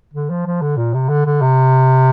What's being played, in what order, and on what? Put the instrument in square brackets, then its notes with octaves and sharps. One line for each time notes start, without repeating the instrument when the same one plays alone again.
[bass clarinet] D3
F3
F3
D3
A#2
C3
D3
D3
C3